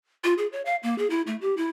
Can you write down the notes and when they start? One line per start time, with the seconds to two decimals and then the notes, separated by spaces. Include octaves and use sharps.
0.24 F4
0.38 G#4
0.52 C#5
0.65 F5
0.83 A#3
0.98 G#4
1.10 E4
1.27 A3
1.41 G4
1.57 E4